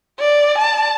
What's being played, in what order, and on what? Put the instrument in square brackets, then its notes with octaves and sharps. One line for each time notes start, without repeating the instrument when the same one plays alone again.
[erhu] D5
A5